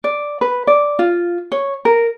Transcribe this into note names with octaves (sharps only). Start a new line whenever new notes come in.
D5
B4
D5
F4
C#5
A#4